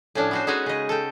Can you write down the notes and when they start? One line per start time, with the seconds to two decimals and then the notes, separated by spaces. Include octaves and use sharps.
0.15 A2 F3 C#4 D4
0.31 B3 F#4 C5
0.47 G#3 B3 C#4 D#4 F#4
0.66 C#3 D#5
0.89 A4 G5